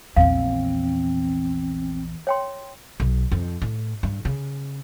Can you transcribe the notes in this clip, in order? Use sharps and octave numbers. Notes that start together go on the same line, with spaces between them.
A#1 E2 C4 F5
C#5 G5 C6
B1
F2
A2
G2
C#3